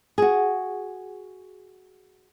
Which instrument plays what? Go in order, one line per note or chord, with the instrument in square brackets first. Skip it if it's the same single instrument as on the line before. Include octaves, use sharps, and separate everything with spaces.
[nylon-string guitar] F#4 G#4